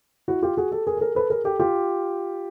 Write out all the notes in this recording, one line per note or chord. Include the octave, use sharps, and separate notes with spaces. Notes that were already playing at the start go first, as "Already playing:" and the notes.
E4 F#4
F4 G4
F#4 G#4
G4 A4
G#4 A#4
A4
G#4 A#4
A4 B4
G#4 A#4
G4 A4
F4 G4